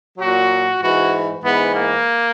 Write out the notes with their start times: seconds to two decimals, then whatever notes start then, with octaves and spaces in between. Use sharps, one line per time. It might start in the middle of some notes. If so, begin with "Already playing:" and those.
0.18 A#2 F#3 F#4
0.81 G#2 E3 F#4
1.42 G#2 E3 B3
1.73 A#3